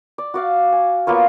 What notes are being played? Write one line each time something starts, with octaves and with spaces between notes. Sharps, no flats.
D5
F#4 D5 F5
G#5
A#3 B3 F4 C#5